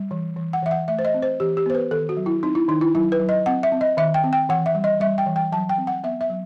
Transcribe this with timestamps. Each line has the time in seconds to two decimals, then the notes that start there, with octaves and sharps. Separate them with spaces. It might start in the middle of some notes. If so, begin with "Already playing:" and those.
Already playing: G3
0.11 E3
0.36 E3
0.53 F#5
0.63 E3 E5
0.71 F#5
0.88 A3 E5
0.99 C5
1.05 D#5
1.14 C4
1.22 C5
1.40 E3 G4
1.57 G4
1.66 B3 C5
1.75 B4
1.91 D#3 A4
2.09 F#4
2.17 F#3
2.26 E4
2.43 C4 D#4
2.55 E4
2.68 D#3 D#4
2.81 E4
2.95 F#3 E4
3.12 B4
3.20 F#3
3.29 D#5
3.46 C4 F#5
3.63 E5
3.72 C4
3.81 D#5
3.97 D#3 E5
4.14 G5
4.24 C4
4.33 G5
4.49 E3 F#5
4.66 E5
4.75 G3
4.84 D#5
5.00 G3 E5
5.18 G5
5.26 E3
5.36 G5
5.52 F#3 A5
5.69 G5
5.78 C4
5.87 F#5
6.03 B3 E5
6.21 E5
6.30 F#3